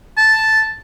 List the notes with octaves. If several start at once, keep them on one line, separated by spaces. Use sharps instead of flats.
A5